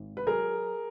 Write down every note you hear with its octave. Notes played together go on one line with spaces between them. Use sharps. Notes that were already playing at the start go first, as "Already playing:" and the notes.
Already playing: G#1
B4
F#3 G#4 A#4